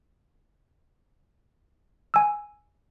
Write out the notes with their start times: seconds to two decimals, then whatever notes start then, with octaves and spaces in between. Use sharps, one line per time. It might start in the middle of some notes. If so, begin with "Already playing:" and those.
2.14 G#5 E6